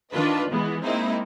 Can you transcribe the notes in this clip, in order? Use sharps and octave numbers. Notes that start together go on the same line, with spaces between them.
D#3 D4 F4 B4 D#5
E3 G#3 B3
G#3 A#3 C4 D#4 E4